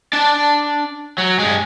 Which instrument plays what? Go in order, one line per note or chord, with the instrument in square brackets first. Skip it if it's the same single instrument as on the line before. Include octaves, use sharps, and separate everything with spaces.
[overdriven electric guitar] D4 A5
F#3
G2 G#3